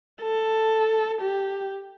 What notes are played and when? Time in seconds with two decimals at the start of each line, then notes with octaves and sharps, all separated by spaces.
0.22 A4
1.22 G4